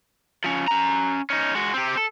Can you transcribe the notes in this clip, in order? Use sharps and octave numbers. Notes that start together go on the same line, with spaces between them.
F3 C#4
C#4 A#5
C#4 D#4
G#3 F#4
C4 G4
A4